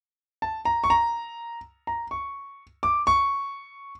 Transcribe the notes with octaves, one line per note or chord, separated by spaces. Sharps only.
A5
A#5
C#6
A#5
A#5
C#6
D6
C#6